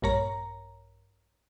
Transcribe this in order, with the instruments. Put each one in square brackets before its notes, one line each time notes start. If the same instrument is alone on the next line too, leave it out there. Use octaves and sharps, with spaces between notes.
[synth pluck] A#1 G2 A#4 C#5 A#5